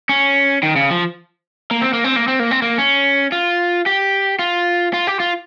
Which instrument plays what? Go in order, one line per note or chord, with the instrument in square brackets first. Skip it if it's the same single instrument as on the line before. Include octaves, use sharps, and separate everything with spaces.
[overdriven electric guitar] C#4
D#3
C#3
F3
A#3
C4
A#3
C4
A#3
C4
A#3
C4
A#3
C#4
F4
G4
F4
F4
G4
F4